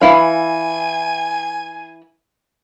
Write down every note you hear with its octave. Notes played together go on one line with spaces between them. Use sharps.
E3 E4 F5 G#5